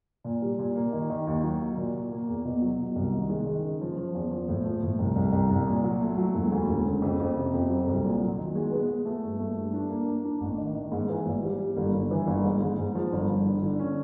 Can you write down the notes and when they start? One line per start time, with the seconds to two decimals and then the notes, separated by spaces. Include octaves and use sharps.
0.24 A#2
0.42 G3
0.59 A#2
0.76 A#3
0.93 D#3
1.10 D#3
1.27 D#2
1.43 F#3
1.61 A#3
1.77 A#2
1.95 A#2
2.12 A#3
2.29 E2
2.45 B2
2.61 F#3
2.79 B2
2.96 C2
3.13 D#3
3.30 G#3
3.47 D#3
3.64 C#3
3.81 F3
3.97 F3
4.14 E2
4.31 F3
4.49 A2
4.65 F3
4.83 A2
4.99 C2
5.16 C2
5.33 C2
5.50 C2
5.67 A#2
5.84 F#3
6.01 A3
6.18 F#3
6.35 E1
6.52 D2
6.69 E1
6.86 C#3
7.02 F2
7.20 F2
7.36 C3
7.54 F2
7.70 F#3
7.88 C2
8.04 A#2
8.21 F#3
8.38 D#3
8.55 G#3
8.71 B3
8.88 B3
9.06 A3
9.23 G2
9.39 A3
9.57 G2
9.73 D4
9.90 A#3
10.07 A#3
10.25 D4
10.41 A1
10.58 D#3
10.75 D#3
10.92 G#2
11.09 E3
11.26 G#1
11.43 G3
11.60 G3
11.77 G1
11.93 G1
12.11 E3
12.27 G1
12.44 G#2
12.61 G#2
12.78 G#2
12.95 F3
13.13 G1
13.29 G1
13.46 D3
13.62 D3
13.79 C#4